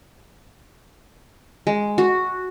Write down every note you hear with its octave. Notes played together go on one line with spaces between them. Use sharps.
G#3
F#4